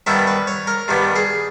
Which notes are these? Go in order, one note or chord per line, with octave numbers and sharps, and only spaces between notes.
G2 D#3 G3 B3 E5
B4
C#5
A#4
G2 D#3 G3 B3
G#4